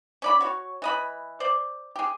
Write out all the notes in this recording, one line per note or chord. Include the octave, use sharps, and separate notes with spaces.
C#4 D5 B5
F#4 C#5
E3 D#5 B5
C5 D5
G4 G#4